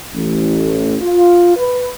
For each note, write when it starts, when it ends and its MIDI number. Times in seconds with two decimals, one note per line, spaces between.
0.15 0.97 33
1.02 1.55 65
1.57 1.88 71